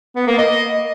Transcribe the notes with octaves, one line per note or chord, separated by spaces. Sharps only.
B3
A#3
D#5